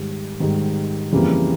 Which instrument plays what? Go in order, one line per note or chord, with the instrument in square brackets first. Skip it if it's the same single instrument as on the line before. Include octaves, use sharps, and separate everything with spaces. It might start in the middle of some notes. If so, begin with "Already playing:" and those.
Already playing: [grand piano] G#2 D#3 G3
G#2 D#3 G3
F2 C#3 E3 G3 A#3